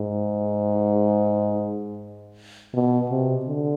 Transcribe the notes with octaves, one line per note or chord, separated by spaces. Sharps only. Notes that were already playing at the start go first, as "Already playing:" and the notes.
Already playing: G#2
B2
C3
D3